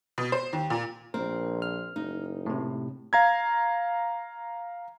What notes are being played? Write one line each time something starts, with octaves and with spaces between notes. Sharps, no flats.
B2
C5
D#2
A#2
A#1 C4 A#4
F6
F#1 D#4
A2 C3
F5 A#5 G#6